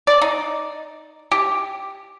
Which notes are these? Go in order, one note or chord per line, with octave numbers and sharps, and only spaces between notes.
D5
D#4
G4